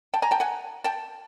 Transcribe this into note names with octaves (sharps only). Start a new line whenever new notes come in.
G5 A5
G#5 A#5
G5 A5
F#5 G#5
G5 A5